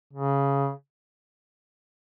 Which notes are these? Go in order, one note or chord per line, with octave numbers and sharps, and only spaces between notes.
C#3